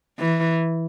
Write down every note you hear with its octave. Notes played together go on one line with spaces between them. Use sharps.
E3